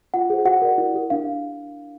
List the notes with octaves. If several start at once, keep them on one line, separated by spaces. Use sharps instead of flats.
F4 F#5
G#4 C5
F#4 F#5
A#4 D5
E4
G4 A#4
D4 F5